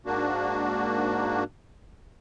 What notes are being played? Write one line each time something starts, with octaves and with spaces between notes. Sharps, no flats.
G#2 A#3 D4 F#4